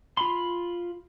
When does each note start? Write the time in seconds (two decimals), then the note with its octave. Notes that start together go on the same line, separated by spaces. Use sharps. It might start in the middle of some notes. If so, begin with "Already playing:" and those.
0.17 F4 B5 C6